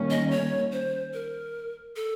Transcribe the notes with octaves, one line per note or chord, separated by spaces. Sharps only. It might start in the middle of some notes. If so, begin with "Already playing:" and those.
Already playing: D#3 G3 A#3 C#4
D#5
C#5
C5
A#4
A4